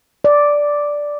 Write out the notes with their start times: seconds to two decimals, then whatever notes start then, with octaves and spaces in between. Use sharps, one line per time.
0.24 D5